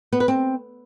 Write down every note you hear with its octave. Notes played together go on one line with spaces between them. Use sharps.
B3
B4
C4